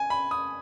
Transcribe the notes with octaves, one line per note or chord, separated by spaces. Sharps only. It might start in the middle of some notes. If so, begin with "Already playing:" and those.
Already playing: G#5
B5
D#6